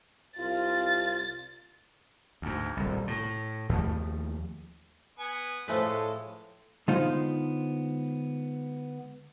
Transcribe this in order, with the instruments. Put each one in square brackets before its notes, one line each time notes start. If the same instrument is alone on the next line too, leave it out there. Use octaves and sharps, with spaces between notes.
[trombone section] C2 F4 [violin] A6
[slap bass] D2 G#2
D#1 C2
A2
D#2 F3 F#3 A3
[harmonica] B3 G#5
[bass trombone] A2 [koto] F3 A3 B4 [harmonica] G#3 A4
[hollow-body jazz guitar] D3 G#3 B3 D#4 F4 C5